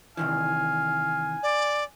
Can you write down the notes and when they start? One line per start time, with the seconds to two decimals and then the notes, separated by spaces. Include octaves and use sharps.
0.17 C3 D#3 E3 F5 G#5
1.43 D5